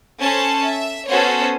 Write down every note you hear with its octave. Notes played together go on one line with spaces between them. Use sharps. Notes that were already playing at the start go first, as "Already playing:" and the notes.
C#4 A4 C5 A5
E5
B3 C#4 F#4 A4 C5 C#5